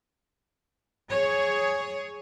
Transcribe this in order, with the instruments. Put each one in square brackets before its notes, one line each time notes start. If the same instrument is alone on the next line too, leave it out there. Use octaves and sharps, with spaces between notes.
[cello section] G#4 C#5